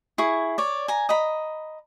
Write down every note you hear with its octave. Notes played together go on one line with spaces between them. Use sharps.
E4 G#4 C#6
C#5 D5
G#5 A#5
D#5 A#5 B5